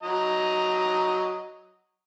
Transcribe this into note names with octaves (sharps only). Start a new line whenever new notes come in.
F#3 D#5 A#5